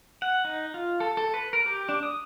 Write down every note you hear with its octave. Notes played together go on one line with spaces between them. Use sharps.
F#5
D#4
F4
A4
A4
B4
A#4
G4
D4
D#6